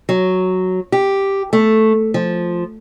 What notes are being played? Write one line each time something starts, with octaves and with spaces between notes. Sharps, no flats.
F#3
G4
A3
F3